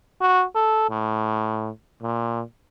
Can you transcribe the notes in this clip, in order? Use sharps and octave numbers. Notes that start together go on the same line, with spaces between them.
F#4
A4
A2
A#2